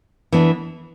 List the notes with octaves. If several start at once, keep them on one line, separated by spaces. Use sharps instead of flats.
E3 B3 D4